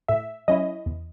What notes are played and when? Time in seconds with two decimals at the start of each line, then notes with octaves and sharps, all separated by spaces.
0.08 A2 E5
0.48 F#3 C#4 E4 D#5
0.86 E2